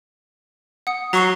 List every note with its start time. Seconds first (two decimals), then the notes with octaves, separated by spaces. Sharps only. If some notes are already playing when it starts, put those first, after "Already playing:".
0.87 F#5 D#6 C#7
1.13 F#3 A#5 C#6 C7